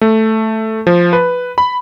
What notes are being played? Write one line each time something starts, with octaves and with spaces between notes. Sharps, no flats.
A3
F3
B4
B5